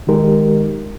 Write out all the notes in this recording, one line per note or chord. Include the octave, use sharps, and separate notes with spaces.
D#3 G#3 D#4 G4 A#4